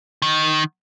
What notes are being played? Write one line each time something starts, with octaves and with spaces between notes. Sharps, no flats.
D#3